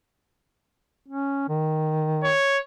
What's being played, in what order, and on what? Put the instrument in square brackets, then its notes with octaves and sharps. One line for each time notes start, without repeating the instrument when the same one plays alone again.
[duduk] C#4
D#3
[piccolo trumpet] C#5